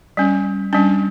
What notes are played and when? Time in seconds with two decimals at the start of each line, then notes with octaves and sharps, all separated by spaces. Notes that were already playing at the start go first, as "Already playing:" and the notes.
0.17 G3 C#4
0.73 G3 C#4 D4